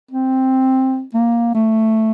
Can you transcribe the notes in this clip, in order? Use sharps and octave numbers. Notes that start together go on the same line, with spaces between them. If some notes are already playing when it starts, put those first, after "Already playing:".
C4
A#3
A3